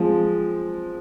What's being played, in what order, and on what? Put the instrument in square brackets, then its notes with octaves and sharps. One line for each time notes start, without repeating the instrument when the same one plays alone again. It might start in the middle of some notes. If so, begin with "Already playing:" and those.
Already playing: [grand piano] F3 G#3 C4